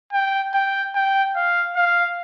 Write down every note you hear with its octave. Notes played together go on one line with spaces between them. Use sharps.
G5
G5
G5
F5
F5